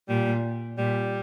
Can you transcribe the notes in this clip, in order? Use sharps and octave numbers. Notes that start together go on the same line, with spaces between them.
A#2 G3
A#2 G3